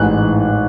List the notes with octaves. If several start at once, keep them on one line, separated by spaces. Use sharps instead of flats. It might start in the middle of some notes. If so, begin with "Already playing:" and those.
Already playing: A1 G#2 E3 F#6
E3